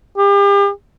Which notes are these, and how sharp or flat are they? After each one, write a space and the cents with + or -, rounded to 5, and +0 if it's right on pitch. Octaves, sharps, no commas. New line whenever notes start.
G4 +40